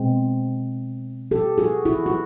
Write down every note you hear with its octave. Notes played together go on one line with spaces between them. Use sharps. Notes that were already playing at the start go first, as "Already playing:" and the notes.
Already playing: B2 G#3 C4
G4 A4
F#4 G#4
E4 F#4
F#4